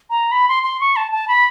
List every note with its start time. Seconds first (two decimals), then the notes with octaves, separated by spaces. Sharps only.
0.10 A#5
0.32 B5
0.49 C6
0.63 C6
0.80 C#6
0.96 A5
1.12 A5
1.28 B5